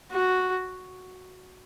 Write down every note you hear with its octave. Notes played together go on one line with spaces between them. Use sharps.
F#4